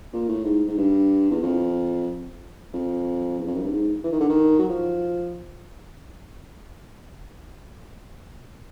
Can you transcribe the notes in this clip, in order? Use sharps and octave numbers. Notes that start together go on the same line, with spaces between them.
A#2
A2
G#2
G#2
G2
E2
F2
F2
E2
F2
F#2
G2
G#2
E3
D#3
D3
D#3
F#3
F3